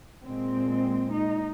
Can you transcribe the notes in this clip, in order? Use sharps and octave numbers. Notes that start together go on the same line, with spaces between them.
A#2 G#3 C4
D#4